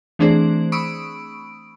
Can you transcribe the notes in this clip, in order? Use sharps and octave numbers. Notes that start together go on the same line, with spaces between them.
E3 A3 C4 D4 G#4 C5
B5 C#6 D#6 E6 D7